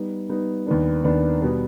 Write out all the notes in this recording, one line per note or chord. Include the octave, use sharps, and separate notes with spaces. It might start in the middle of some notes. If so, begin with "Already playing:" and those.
Already playing: G3 B3 D#4
G3 B3 D#4
D#2 D#3 B3 D4
D#2 D#3 B3 D4
B2 G3 B3